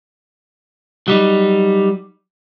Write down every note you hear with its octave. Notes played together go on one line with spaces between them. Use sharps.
F#3 G3 D#4